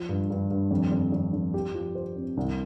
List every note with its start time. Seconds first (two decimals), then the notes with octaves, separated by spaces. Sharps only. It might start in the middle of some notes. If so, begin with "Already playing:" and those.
Already playing: F3
0.09 G2
0.30 G2
0.50 G2
0.71 F2
0.92 F2
1.12 F2
1.33 F2
1.54 G4
1.74 F3
1.95 C5
2.16 C4
2.37 C2